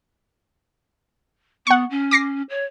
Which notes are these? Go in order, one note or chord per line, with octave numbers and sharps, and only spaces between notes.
B3 F#5 C#6
C#4
D6 A#6 C7
C#5